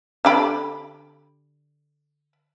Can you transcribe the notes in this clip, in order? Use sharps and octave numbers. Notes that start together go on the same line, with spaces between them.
D3 G4 B5